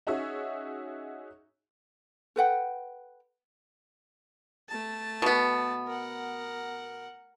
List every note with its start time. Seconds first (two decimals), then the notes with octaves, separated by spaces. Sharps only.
0.07 C#4 D#4 F#4 G#4 C#5 E5
2.36 A4 B4 F#5 G5
4.68 A3 A5
5.22 B2 B3
5.87 A#4 F#5